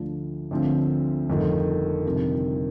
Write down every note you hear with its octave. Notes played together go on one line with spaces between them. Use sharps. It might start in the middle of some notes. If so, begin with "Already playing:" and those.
Already playing: D2 D3 F3
D2 D3 F3 C4
G1 F2 D#3 A3
G1 F2 C3 D#3